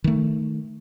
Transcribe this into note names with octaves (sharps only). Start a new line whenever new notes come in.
D#3 A3